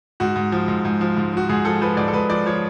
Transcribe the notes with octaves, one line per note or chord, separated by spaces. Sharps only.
G#2 F#4
G#2
F3
G#2
G#2
F3
G#2
F3 F#4
G#2 G#4
F3 A4
F3 B4
G#2 D5
A4
G#2 B4
F3 D5
F3 C#5